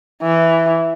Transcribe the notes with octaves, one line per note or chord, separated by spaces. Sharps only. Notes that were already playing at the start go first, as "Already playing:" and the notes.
E3